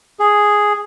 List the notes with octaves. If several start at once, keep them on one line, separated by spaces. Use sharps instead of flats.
G#4